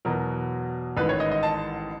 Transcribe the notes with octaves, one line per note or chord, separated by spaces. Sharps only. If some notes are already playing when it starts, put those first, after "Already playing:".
E2 B2 F#3 A#4
A1 G#2 D#3 B4
C#5
D#5
D#5
A5